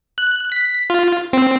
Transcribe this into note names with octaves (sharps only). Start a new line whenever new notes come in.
F#6
B6
F4
C4